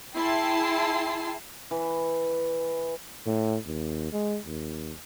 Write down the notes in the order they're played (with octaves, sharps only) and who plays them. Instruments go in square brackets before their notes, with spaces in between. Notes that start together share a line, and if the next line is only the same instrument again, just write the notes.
[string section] E4 G#4 G5 A5 C6
[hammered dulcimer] E3
[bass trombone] A2
D#2
G#3
D#2